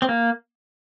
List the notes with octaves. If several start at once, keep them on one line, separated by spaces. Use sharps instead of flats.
C4
A#3